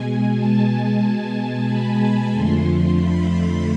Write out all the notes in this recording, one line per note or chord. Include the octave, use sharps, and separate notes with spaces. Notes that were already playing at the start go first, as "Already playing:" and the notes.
Already playing: B2 G#3 G#5
A5
B5
F2 D3 F3 A3 C6
B5